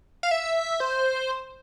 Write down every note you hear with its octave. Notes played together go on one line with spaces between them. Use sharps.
F5
E5
C5